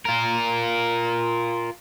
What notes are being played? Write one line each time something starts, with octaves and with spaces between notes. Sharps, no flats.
F4 A#4